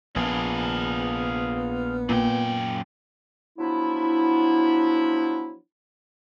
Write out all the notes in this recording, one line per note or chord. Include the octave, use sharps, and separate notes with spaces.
A#1 B3 F4 G#4
F#2 A#2 G5
F3 F#3 B3 D4 E4